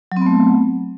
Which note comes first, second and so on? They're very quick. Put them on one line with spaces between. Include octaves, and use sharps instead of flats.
F#3 C4 B3 A3